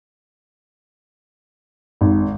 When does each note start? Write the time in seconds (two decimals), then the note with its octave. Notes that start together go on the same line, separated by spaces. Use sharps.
2.01 G#1